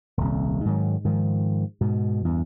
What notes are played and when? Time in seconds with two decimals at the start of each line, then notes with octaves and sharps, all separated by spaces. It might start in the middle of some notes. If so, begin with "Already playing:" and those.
0.17 D#1 C2
0.65 G#2 D#3 F#3
1.04 G#2 D#3 F3
1.81 G#2 B2
2.25 E2 G2